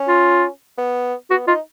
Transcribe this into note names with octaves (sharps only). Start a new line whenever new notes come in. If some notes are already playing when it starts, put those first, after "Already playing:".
Already playing: C#4
F4
B3
B3 F#4
D#4 F4